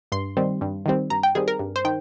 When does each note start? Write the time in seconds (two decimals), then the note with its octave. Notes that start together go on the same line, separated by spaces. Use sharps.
0.12 G2 C6
0.37 D#3 G3 C4
0.61 G2
0.86 D#3 G3 C4
1.10 G2 A#5
1.23 G5
1.35 D#3 G3 C4 G#4
1.48 A#4
1.59 G2
1.76 C5
1.85 D#3 G5